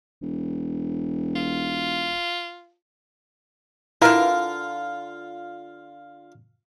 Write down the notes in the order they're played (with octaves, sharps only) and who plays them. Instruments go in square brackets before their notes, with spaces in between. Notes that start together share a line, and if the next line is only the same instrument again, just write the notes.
[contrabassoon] E1
[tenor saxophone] F4
[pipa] D3 A#4 [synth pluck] E4 B4 F5 [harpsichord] F4